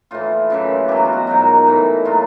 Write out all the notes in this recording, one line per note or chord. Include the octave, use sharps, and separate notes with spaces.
A2 E3 F4
F#2 C#3 E3
B2 F#3 G4
F#4
F4
F#4
G#2 D#3 F#3
A2 E3
A#2 F#3 F4